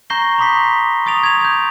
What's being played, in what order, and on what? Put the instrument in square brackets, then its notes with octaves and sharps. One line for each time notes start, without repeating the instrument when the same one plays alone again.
[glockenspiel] A#5 C#6 G6 A#6 C7 G7
B5 C6 D6 D#6 B6 C7
C#6 D#6 A6 D7 F7
G#6 F7
G6 G#6